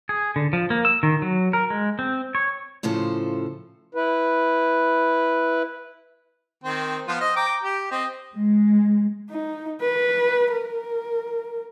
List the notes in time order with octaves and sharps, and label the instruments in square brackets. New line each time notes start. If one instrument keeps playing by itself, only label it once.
[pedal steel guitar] G#4
D3
F3
A#3
E6
D#3
F#3
A#4
G#3
C4
C#5
[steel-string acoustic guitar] A2 C#3 F3 A4 C5
[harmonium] E4 B4
[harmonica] D#3 C4
F3 B3 F4
C5 D#5
G5 A#5 D6
G4
C4 D#5
[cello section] G#3
[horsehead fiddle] D#4
B4
A#4